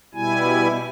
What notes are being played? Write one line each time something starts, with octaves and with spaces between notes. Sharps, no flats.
B2 G3 E4 G#5